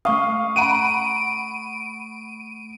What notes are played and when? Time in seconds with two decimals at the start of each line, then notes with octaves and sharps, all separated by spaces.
0.05 A3 F5 C#6 D#6
0.56 F#5 A#5 B5 D7 D#7